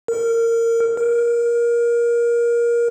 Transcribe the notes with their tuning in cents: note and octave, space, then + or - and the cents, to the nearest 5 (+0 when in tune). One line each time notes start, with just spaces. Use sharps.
A#4 -20
A#4 +20